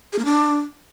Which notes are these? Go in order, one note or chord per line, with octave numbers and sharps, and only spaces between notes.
G#4
A#3
D4